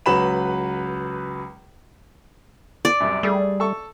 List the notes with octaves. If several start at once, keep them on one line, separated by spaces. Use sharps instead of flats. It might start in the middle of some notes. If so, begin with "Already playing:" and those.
C#2 F#3 B4 B5 E7
D5
C2 F#2
G3 A3 G#4
A4 C#6